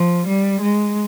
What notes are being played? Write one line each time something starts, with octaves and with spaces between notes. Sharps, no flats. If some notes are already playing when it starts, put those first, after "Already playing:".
Already playing: F3
G3
G#3